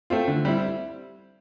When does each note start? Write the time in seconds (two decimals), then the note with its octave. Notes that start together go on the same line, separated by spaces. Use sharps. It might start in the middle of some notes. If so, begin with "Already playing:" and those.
0.10 A3 C4 F4
0.28 D3
0.45 G3 C4 E4